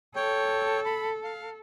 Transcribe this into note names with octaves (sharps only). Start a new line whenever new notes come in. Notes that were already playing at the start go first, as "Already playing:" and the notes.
A4 C#5 G5
B5
F5